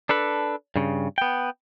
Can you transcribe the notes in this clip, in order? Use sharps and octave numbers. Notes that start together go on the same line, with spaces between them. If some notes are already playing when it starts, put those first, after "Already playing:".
D4 A4 B4
G2 C#3
B3 G5